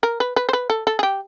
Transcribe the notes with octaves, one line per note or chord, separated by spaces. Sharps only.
A#4
B4
B4
C5
B4
A4
A4
G#4
G4